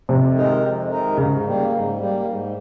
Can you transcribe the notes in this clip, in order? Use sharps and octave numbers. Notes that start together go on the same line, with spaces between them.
F2 C3
D#3 G#3 D#4 A#4
F2
D#3 G#3 D#4 A#4
G#2 C#3
G3 A#3
G#2
G3 A#3
G#2